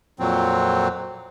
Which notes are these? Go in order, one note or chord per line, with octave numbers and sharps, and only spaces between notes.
F2 A#2 F#3 C4